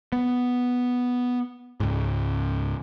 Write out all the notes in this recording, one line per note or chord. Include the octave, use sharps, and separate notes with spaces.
B3
C#2 G#2